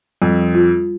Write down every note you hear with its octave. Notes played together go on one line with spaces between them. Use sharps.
F2 G3
F4